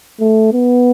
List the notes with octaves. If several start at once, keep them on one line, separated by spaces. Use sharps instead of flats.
A3
B3